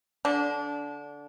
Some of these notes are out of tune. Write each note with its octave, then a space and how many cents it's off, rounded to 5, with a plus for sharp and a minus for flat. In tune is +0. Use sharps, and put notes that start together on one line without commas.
D3 -15 D4 -25